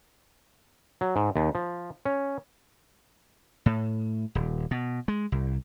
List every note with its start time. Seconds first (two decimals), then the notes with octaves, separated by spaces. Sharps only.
1.01 F#3
1.16 G#2
1.36 D#2
1.55 F3
2.05 C#4
3.66 A2
4.35 D#1
4.71 B2
5.08 G#3
5.32 C2